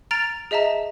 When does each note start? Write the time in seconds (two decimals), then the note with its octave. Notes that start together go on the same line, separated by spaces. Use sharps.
0.11 A#5 F6 A6 D7 F7
0.51 G#4 D#5 E5 A5 A#5